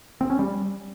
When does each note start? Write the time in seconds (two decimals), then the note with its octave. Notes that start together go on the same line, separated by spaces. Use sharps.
0.21 C4
0.30 C#4
0.39 G3